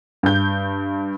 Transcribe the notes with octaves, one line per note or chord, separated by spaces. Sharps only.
G2 G6